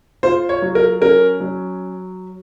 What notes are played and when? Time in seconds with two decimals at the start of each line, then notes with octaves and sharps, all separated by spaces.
0.23 F4 C5
0.49 C#5
0.62 F#3
0.75 A#4
1.01 C#4 A#4
1.40 F#3